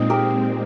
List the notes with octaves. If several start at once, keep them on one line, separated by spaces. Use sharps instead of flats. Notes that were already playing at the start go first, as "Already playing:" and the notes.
Already playing: A#2 G#3 C4 D#4
G4 A#4